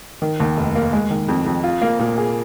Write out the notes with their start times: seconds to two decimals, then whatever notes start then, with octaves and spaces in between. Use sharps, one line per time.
0.22 D#3
0.40 D#2
0.57 F1
0.75 A#3
0.93 G#3
1.10 D#3
1.28 F2
1.46 F2
1.64 F4
1.82 A#3
1.99 A#2
2.18 G#4